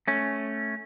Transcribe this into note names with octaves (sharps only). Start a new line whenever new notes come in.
A3 C#4